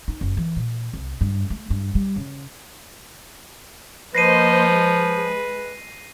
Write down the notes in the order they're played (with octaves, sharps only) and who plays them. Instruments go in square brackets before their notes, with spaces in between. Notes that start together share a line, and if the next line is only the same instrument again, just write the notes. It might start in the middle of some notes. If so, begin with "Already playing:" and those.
[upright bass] D#4
F#1
E3
A#2
C2
G2
A3
G2
G3
C#3
[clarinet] F3 [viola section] A#3 C5 D#5 [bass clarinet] B4 [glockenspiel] A#6 C7 D#7
[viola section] G#3